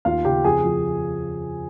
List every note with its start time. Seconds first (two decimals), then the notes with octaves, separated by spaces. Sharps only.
0.05 D#2 F4 F5
0.25 C#3 G4 G5
0.44 F2 G#4 G#5
0.64 F3